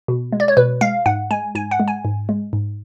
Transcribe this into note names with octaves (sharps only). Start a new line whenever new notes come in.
B2
G#3
D5
C#5
B2 B4
G#3 F5
G#2 F#5
G#3 G#5
G#2 G#5
F#5
G#3
G#5
G#2
G#3
G#2